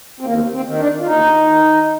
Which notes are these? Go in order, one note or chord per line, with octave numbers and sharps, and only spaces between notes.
C4
D#2 A#3
C4
D#3
D4
F4
D#2 D#4
D#3